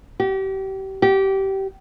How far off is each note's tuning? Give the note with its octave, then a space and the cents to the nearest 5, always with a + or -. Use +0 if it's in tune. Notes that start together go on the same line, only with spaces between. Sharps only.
G4 -30
G4 -20